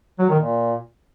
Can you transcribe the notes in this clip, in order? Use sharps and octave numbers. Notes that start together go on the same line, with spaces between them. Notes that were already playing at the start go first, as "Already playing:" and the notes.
F#3
D#3
A#2